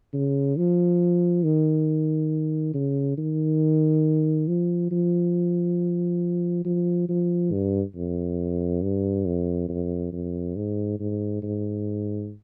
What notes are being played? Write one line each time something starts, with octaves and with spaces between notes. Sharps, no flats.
C#3
F3
D#3
C#3
D#3
F3
F3
F3
F3
G2
F2
G2
F2
F2
F2
G#2
G#2
G#2